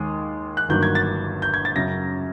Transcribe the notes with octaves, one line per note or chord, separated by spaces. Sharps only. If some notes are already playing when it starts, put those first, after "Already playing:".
Already playing: D#2 D#3 G#3 D#6
F#6
G1 G2 D#3 F#3 A#3 G6
G#6
A6
G6
G#6
A6
F#2 C#3 F#3 A#6